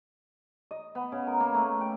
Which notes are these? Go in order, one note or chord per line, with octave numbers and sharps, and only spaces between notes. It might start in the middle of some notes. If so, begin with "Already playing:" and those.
D#5
B3
C#3
A#4
A#3
A3
G5